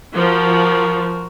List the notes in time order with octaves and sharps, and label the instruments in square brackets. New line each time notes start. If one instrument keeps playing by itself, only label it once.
[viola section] F3 [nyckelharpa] F#4 A#4